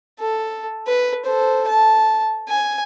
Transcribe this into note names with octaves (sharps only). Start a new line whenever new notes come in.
A4
B4
A4 C5
A5
G#5